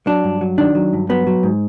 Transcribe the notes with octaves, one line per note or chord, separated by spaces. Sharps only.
F#3 D4
G2
F#3
D#3 D4
F#3
G2
F#3 B3
F#3
G#2